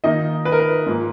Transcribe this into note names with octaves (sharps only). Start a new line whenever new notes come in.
D#3 A#3 D#4 D#5
B4
A#4
B4
G#2 F3 A#3